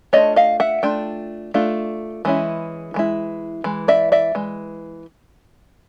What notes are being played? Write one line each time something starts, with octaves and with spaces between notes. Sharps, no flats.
A3 D4 F4 C#5 D#5
D#5 F5
E5 F#5
A3 D4 F4 G5
A3 D4 F4
E3 G#3 C#4 E4
E3 G#3 E4
E3 G#3
D5 E5
D5 E5
E3 G#3